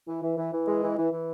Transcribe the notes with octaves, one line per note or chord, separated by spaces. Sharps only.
E3
E3
E3
E3
G#3
E3
E3
E3